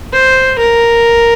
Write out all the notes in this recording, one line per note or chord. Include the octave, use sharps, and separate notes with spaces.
C5
A#4